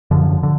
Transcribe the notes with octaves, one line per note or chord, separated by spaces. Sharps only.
F#2 D3 F3
D3